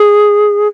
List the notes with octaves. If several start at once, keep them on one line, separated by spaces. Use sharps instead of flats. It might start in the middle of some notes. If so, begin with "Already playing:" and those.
Already playing: G#4